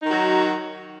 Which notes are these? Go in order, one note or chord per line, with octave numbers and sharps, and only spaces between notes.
D#3 F#3 D#4 F#4